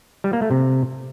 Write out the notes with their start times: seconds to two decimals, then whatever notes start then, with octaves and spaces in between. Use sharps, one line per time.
0.24 G3
0.33 A#3
0.42 A3
0.51 C3